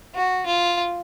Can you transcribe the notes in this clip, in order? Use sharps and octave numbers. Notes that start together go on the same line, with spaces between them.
F#4
F4